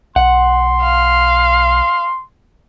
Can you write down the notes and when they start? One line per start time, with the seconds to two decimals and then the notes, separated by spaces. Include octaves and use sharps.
0.16 B1 F#5 C6
0.83 F5